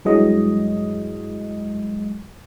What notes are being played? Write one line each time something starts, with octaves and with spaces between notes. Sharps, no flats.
G2 E3 F#3 G#3 D#5